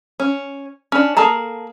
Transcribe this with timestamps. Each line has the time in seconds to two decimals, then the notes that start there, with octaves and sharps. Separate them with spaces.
0.20 C#4
0.92 C#4 D4
1.17 A#3 G#4 A4 A5 A#5